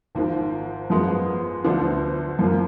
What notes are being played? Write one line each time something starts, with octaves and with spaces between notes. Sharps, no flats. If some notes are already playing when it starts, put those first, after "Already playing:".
G#1 G#2 F3
F#2 F3 G#3 B3 F4
D2 D3 F3 B3 D4
F#2 F3 A#3